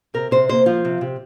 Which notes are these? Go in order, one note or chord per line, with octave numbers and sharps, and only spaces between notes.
C3 A#4
C3 C5
A#3 C5
F3 F4
C3
C3